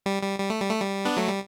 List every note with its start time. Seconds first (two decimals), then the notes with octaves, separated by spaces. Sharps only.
0.06 G3
0.23 G3
0.39 G3
0.50 A3
0.61 G3
0.70 A3
0.81 G3
1.05 B3 D4
1.17 F#3 A3
1.28 G3